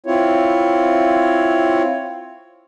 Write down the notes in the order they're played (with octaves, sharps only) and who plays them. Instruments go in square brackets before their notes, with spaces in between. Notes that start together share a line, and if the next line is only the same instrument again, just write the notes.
[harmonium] C4 E4 F4 C#5